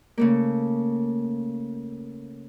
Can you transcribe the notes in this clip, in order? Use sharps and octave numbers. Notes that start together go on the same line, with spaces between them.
C#3 A3 A#3